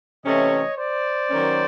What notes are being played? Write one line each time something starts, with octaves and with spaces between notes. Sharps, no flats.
C3 E3 A3 C#4 C#5 D#5
C5 D5
D#3 F#3 A#3 C#4